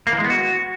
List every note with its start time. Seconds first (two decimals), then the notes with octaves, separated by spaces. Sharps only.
0.07 A#3
0.13 E3
0.18 G#3
0.24 B3
0.30 F#4